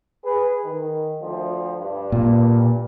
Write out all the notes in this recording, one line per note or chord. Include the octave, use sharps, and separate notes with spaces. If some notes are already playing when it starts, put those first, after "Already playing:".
G#4 B4
D#3
D2 F3
G2
A#2